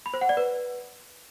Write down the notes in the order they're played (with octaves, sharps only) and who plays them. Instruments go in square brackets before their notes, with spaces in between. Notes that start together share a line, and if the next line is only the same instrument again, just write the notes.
[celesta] B5
C5
F#5
D5
B4